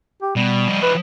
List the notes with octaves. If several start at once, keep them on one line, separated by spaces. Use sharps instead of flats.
G4
B2 G3
F3 D#4
B4